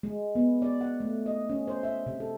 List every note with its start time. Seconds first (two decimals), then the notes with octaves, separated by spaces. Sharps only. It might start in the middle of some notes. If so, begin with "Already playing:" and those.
0.03 G#3
0.35 B3
0.62 D5
0.81 F#5
1.00 A3
1.26 D#5
1.50 C#4
1.68 C5
1.83 E5
2.06 C3
2.20 A4